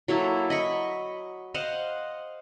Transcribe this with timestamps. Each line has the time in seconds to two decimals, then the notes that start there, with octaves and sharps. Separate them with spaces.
0.08 F#3 A#3 E4 A4
0.50 D#5 B5 C#6
1.54 C5 D#5 F5 F#5